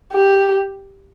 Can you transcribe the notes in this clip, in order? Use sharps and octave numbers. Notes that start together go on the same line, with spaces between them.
G4